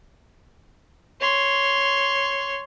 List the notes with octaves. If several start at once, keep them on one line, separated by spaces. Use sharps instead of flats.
C#5 C6